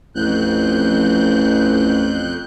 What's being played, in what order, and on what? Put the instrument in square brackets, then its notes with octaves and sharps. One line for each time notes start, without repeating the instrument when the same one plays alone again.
[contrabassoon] A1 [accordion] F2 F#6 G6